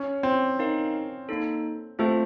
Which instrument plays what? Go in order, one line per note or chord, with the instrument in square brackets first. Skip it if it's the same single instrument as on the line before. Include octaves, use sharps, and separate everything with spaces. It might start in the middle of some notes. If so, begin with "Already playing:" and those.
Already playing: [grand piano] C#4
C4
[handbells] D#4 A#4 F5
A#3 D#4 A4
[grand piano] A3 [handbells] C4 F4 C5 F5